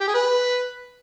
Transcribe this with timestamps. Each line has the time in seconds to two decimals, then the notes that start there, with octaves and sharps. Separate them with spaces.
0.01 G4
0.08 G#4
0.14 B4